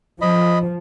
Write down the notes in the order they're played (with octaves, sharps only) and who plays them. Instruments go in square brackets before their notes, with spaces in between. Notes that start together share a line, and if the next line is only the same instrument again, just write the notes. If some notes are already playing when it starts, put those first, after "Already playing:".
[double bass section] F3 [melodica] D#5 B5